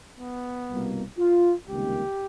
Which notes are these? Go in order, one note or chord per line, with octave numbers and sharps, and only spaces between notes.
B3
C2 B2 G3 A#3
F4
C#2 C3 D#3 G3 A#3 G4